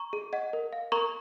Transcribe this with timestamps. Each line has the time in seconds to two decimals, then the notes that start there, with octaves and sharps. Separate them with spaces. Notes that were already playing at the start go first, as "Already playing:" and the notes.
Already playing: A#5 C#6
0.13 G#4
0.33 D#5 F#5
0.53 A#4
0.73 F5
0.92 A#4 A#5 C#6